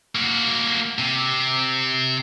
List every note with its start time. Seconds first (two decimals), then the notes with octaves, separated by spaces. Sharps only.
0.15 A#3 F#4
0.99 C3